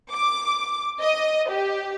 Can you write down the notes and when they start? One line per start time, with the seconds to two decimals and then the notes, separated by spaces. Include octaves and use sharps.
0.10 D6
1.00 D#5
1.49 G4